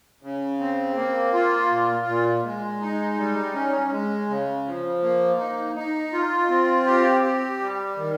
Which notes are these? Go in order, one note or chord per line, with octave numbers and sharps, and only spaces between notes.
C#3
C4
A#3
F4
A#2
A#2
G#3
D#4
G3
C#4
G#3
C#3
F3
A#3
D#4
D#4
F4
C4
G4
G4
G3
D#3